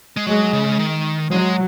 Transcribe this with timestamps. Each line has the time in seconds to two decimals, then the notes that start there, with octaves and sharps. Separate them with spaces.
0.17 G#3
0.27 F#3 G#3
0.53 C#3
0.79 D#3
1.31 F#3 G#3